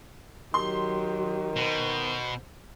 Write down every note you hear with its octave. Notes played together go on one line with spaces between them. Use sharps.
D#3 F#3 G4 C6
B2 C5